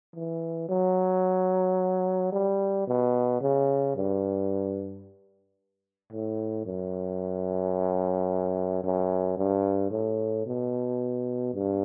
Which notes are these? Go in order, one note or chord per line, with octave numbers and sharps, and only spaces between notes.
E3
F#3
G3
B2
C#3
G2
A2
F#2
F#2
G2
A2
B2
G2